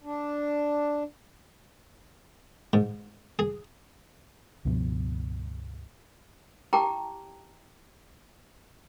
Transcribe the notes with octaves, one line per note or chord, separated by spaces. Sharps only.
D4
G#2
G#4
C#2 G2 B2 F3
E4 G4 G5 A5 A#5 D6